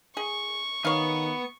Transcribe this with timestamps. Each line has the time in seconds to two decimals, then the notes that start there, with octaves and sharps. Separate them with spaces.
0.17 G#4 C#6
0.85 D#3 B3 C#5 F5